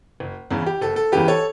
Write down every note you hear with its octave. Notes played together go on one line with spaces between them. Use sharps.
F#1
E2 C#3 E3
G4
F#1 A4
A4
E2 C#3 E3 G4 B4
A4 C#5